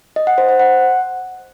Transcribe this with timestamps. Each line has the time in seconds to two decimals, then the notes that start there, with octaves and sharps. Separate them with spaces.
0.16 D#5
0.27 F#5
0.38 C5
0.49 C5
0.59 F#5